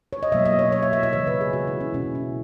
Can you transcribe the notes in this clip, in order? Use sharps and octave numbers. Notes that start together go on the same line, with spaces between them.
C#5
D#5
B2 F#3 A#3 E5
D#5
C#5
C#5
E5
E5
E5
C#3 E3 G#3 C#5
B4
G#4
F#4
E4
C#4
B2 A#3 C#4
E4